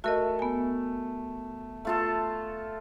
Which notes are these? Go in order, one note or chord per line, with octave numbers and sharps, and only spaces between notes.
A3 F#4 A#4 D#5
B3 G#5
A3 F4 A4